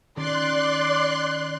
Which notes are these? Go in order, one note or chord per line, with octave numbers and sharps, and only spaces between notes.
D#3 C#4 D5 C6 F#6